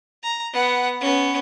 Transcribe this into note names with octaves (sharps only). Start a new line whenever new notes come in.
A#5
B3 F#5
B3 C#4